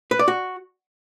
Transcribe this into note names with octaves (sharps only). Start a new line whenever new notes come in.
B4
D5
F#4